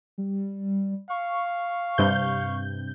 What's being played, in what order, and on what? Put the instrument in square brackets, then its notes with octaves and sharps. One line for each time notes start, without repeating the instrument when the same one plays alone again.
[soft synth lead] G3
[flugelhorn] F5 [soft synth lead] C#6
[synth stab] G2 C3 G6